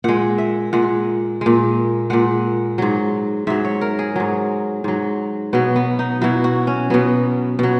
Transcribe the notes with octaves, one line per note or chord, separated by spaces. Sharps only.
A#2 G#3 F#5
E5
A#2 G#3 F#5
A#2 G#3
A#2 G#3 F#5
G#2 F#3
G#2 F#3 E5
C#5
A#4
G#4
G#2 F#3
G#2 F#3
B2 F#3 B3
B3
D#4
B2 F#3 E4
F#4
C#4
B2 F#3 B3
B2 F#3